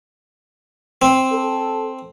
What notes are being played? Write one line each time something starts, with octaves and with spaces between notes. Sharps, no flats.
C4
A4